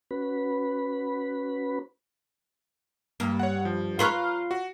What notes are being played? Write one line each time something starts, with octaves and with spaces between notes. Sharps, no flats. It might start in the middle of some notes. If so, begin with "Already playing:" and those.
C#4 F#4 B4 B5
G2 A#3
C#5 F#5
F3
F4 B4 C#5 F5 A#5 F6
F#4